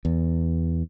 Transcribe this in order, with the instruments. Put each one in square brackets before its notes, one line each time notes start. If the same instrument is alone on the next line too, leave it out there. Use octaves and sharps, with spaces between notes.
[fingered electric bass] E2